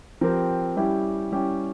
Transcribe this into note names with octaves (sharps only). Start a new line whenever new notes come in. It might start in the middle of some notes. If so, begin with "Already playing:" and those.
F3 C4 G4 A#4
G3 C#4 E4 G4
G3 C#4 E4 G4